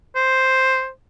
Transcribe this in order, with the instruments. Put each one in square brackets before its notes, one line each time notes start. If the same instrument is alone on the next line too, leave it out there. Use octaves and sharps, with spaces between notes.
[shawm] C5